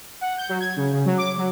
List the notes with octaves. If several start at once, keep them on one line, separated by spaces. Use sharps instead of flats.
F#5
G6
F#3
G#6
C#3
C#3
F#3
D6
F#3